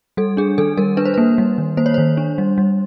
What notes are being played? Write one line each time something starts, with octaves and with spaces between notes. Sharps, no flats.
G3 A4
D4 G#4
D#3 A4
G3 A#4
D4 B4
C5
A#3 B4
G3
D#3
A#3 C5
C#5
D#3 C5
D4
G3
G3